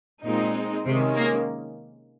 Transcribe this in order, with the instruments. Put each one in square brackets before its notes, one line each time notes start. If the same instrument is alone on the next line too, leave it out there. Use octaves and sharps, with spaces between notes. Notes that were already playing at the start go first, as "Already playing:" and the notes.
[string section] A#2 [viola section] G#3 C4 D#4
[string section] C3 [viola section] D#3 G#3 C#4
[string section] A#3